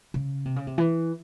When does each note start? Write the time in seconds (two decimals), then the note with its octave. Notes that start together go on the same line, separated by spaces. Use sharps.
0.14 C#3
0.45 C3
0.56 C#3
0.67 C3
0.78 E3